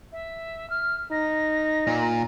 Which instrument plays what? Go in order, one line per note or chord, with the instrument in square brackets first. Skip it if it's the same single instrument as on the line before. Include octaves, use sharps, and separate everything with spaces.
[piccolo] E5
F6
[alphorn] D#4 [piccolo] A#6
[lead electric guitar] A#2